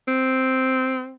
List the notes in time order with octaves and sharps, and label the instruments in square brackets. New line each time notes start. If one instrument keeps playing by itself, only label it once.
[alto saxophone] C4